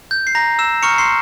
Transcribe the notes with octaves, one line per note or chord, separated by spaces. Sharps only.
G6
C7
A#5 A#6
E6 E7
A#5 C#6 F6 C#7
C6 C7